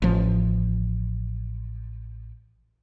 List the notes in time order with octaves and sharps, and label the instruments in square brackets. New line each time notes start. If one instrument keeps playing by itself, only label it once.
[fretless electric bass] A1 F3